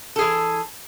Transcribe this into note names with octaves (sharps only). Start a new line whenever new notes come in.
E3 G#4 A4